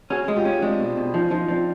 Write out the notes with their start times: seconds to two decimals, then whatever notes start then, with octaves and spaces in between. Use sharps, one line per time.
0.10 C#4 F#4 G#4
0.28 G#3
0.36 F4 G4
0.45 C#4
0.62 G#3 C4 D4
0.80 B2
0.97 B2
1.14 F3 C#4 D#4
1.31 F3 D#4 F4
1.48 F3 C4 D4